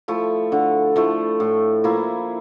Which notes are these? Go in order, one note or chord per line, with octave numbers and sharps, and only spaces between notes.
F3 A3 E4
D3
F3 A3 E4
A2
F3 A#3 E4